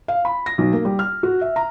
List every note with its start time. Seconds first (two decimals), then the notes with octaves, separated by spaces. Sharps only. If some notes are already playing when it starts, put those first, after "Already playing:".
0.08 F5
0.25 B5
0.46 A#6
0.58 B1
0.73 A#3
0.85 G3
0.99 F6
1.23 F#4
1.41 E5
1.56 A#5